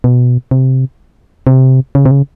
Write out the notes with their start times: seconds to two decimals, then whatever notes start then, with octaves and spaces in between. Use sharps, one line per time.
0.04 B2
0.51 C3
1.47 C3
1.95 C#3
2.06 C3
2.11 C#3